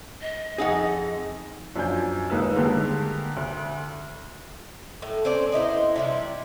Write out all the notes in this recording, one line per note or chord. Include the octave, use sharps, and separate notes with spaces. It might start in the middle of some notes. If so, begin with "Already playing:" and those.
D#5
F2 C4 D#4 G#4 F#5
F#2 F3 D4 D5 G#5 G6
D#2 G#3 D#4 A#4 B4 E6
D3 D#3 G3 G#3 A#3
D2
A2
C4 C#4 C5 D5
B3 D#4 E4 C5
C3 G3 E4